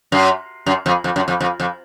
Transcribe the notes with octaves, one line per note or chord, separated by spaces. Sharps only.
F#2
F#2
F2
F2
F#2
F2
F2
F2